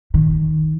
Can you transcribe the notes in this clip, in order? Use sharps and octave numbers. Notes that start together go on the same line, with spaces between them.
D#3